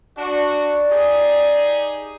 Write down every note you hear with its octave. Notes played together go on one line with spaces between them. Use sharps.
D4 F#4 D5
D#4 G4 G#4